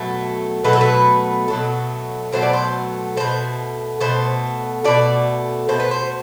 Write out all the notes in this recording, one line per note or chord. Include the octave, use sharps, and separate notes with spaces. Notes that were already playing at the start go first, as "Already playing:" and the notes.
Already playing: B2 F#3 A3
B2 F#3 A3 B4
A4
B4
B2 F#3 A3
B2 F#3 A3 C5
D5
C5
B2 A3 C5
B2 A3 C5
B2 A3 D5
B2 A3 C5
B4
C5